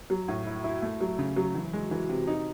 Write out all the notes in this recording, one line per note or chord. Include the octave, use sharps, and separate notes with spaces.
F#3
A2
E4
E4
A3
F#3
C#3
F#3
E3
G#3
E3
C3
D#4